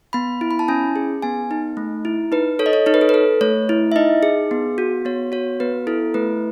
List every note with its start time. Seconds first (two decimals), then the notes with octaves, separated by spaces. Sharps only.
0.13 B3 B5
0.41 E4
0.51 B5
0.59 A5
0.68 C#4 G#5
0.96 G#4
1.22 B3 G#5
1.51 D#4
1.77 A3
2.05 E4
2.32 D#4 B4
2.59 A4 C#5
2.66 D#5
2.73 C#5
2.86 D#4 C#5
2.94 B4
3.01 A4
3.09 B4
3.14 A4
3.41 A3 C#5
3.69 E4
3.92 E5
3.96 D#4 D#5
4.23 G#4
4.51 B3
4.78 F#4
5.05 B3 C#5
5.32 F#4 C#5
5.60 B3 B4
5.87 E4 A4
6.14 A3 B4